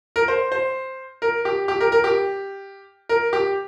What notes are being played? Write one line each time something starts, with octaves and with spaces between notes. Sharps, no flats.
A#4
C5
C5
A#4
G4
G4
A#4
A#4
G4
A#4
G4